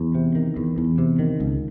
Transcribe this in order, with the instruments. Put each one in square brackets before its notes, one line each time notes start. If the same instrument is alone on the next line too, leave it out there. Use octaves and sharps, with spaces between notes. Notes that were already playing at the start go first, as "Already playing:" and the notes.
Already playing: [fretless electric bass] E2
C3
D#3
E2
E2
C3
D#3
C#2